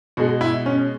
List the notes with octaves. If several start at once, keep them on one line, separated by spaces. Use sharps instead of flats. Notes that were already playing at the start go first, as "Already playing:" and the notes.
B2 G#3 F#4
E4
C#4